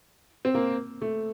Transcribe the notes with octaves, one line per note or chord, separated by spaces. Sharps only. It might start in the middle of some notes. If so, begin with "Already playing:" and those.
C4
A#3
A3